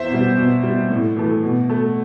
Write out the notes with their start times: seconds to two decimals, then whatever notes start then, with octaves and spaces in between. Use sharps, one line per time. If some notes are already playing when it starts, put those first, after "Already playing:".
Already playing: E2 C5 E5
0.10 B2 G3
0.37 B2
0.63 G3
0.90 A2
1.16 E3 A3
1.43 B2
1.69 A3